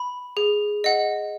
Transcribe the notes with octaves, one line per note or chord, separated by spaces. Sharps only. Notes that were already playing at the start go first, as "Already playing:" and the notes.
Already playing: B5
G#4
D#5 F#5